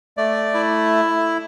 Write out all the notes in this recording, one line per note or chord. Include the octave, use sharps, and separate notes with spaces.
A3 D5
E4